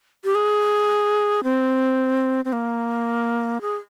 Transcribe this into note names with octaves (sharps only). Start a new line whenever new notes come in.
G4
G#4
C4
C4
A#3
G#4